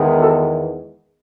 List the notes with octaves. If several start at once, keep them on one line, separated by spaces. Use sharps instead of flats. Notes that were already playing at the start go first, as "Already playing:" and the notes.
Already playing: E2 D#3 G#3 B3
F#4 A4